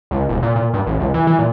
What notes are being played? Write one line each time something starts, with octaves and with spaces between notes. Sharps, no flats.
C#2
E1
A#2
A#2
G2
A1
C#2
E3
E3
A#2